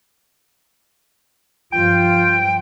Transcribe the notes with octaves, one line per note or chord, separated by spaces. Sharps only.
G2 F3 F4 G5 D7